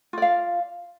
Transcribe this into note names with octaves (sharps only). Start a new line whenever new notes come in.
F4 D5 F5